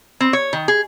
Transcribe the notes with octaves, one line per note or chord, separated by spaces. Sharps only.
C4
C#5
D#3
G#4